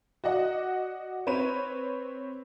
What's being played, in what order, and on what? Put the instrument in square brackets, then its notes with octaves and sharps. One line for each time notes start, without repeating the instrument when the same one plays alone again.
[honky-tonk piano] F#4 D5 D#5 F#5
C4 B4 C#5 D#7